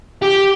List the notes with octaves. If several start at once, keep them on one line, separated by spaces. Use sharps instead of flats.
G4